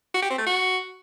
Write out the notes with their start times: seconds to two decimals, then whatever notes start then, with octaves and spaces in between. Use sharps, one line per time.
0.14 F#4
0.22 G4
0.30 C4
0.38 A3
0.46 F#4